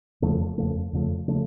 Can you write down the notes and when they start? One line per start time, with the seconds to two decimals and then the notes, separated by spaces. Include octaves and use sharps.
0.22 F2 C#3 F3 A3
0.58 F2 C#3 F3 A3
0.93 F2 C#3 F3 A3
1.28 C#3 F3 A3